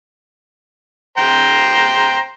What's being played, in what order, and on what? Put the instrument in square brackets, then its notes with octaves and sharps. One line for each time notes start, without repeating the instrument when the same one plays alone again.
[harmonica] C5 G5 A#5